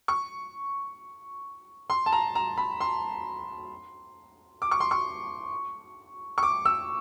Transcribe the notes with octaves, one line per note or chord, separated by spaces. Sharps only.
C#6
C6
A5
A#5
A#5
B5
C6
D6
C#6
C6
C#6
C#6
D6
E6